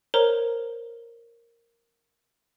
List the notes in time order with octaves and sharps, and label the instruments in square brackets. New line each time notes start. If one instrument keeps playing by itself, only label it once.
[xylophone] A#4 C5 C#5 A#5